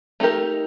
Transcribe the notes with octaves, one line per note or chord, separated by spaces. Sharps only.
A3 D#4 G4 A#4